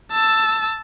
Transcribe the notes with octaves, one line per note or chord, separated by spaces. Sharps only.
A5 E6